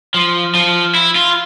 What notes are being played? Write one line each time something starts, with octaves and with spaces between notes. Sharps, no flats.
F3
F3
E4
F4